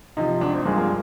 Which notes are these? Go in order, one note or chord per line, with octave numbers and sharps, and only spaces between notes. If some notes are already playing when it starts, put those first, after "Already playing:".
C3 F3 D#4
G#1 D4
C4
G2 F3 G#3 A#3
A#3